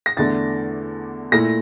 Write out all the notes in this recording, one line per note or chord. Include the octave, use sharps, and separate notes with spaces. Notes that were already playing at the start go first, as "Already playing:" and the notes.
A#6
E2 D3 A3 A6
A#2 A3 E4 A#6